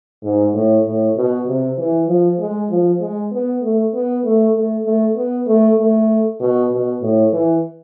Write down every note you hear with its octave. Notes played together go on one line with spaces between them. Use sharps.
G#2
A2
A2
B2
C3
E3
F3
G#3
F3
G#3
B3
A3
B3
A3
A3
A3
B3
A3
A3
B2
B2
A2
E3